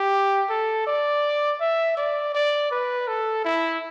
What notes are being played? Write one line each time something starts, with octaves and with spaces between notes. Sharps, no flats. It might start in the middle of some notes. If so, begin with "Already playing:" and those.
Already playing: G4
A4
D5
E5
D5
D5
B4
A4
E4